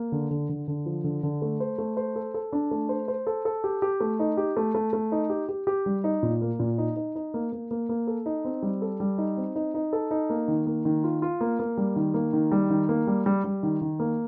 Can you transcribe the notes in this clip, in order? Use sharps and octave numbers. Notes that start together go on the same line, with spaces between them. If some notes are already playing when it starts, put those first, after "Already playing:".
Already playing: A#3
D3
D3
D3
D3
F3
D3
D3
A3
C5
A3
C5
A4
A4
D4
A3
C5
C5
A4
A4
G4
G4
A3
D#4
G4
A3
A3
A3
D#4
G4
G4
G4
G3
D#4
A#2
A#3
A#2
D#4
D#4
D#4
A#3
A#3
A#3
A#3
A4
D#4
C4
G3
A4
G3
D#4
C4
D#4
D#4
A4
D#4
A#3
D#3
A#3
D#3
F4
F4
A#3
A#3
G3
D#3
A#3
D#3
G3
D#3
A#3
G3
G3
G3
D#3
D#3
A#3